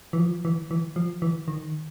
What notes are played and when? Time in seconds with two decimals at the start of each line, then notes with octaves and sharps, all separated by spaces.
0.13 E3
0.19 F3
0.45 E3
0.71 E3
0.96 F3
1.22 E3
1.48 D#3